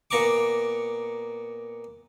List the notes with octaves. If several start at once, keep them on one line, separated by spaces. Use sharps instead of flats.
A#2 B3 A#5 C#6 D6